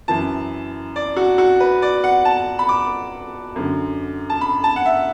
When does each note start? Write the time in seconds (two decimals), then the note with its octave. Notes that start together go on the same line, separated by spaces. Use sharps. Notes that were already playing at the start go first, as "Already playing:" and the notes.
0.08 F#2 E3 A5
0.96 D5
1.17 F#4
1.38 F#4
1.60 B4
1.82 D5
2.04 F#5
2.25 A5
2.59 B5
2.69 D6
3.56 F#2 D3
4.30 A5
4.41 B5
4.64 A5
4.76 F#5
4.86 E5